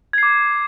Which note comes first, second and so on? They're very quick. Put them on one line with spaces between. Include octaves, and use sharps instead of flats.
G#6 C7 D6